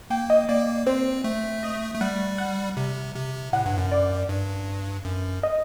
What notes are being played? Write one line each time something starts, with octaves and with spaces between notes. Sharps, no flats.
A#3 G5
D#5
A#3 D5
C4 C5
A3
D#5
A3
G3 F#5
F#5
C3
C3
A2 F#5
G2
F#2
D5
G2
F#2
D#5